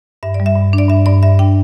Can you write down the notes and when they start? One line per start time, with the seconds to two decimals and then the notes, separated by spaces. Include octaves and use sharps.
0.23 G2 E5
0.34 D5
0.40 G3
0.46 E5
0.56 G2
0.73 D4
0.78 D5
0.89 G2 E5
1.06 G2 D5
1.22 G2 E5
1.39 D4 G5